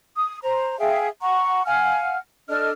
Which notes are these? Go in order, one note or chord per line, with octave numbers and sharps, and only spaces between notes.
D#6
C5 A#5
G#4 E5 F5 G5
F#5 A#5 C#6
F5 F#5 G#5 F6
D4 A4 D#5 F6